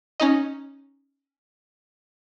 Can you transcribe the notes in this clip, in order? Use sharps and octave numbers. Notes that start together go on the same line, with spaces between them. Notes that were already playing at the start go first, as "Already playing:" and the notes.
C#4 D#4 D#5